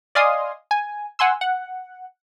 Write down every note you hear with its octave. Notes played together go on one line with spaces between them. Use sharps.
D5 D#5 F5 G#5 C6 D#6
G#5
F#5 G#5 C6 E6
F#5